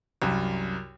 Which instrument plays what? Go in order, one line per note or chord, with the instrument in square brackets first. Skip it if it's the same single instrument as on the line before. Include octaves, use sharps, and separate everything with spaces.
[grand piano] C2 F#2